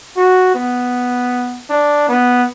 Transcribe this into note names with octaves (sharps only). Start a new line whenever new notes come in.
F#4
B3
D4
B3